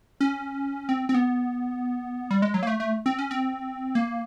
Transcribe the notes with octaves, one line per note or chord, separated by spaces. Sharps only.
C#4
C4
C4
B3
G3
G#3
F#3
A#3
A3
A3
C4
C#4
C4
A#3